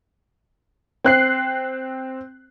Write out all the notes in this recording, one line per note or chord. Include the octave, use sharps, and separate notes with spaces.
C4 F#6 C7